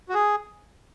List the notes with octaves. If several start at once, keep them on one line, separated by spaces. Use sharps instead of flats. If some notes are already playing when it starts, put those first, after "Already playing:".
F#4
G#4